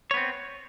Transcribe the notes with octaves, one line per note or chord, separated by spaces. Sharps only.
B3 C4 C#5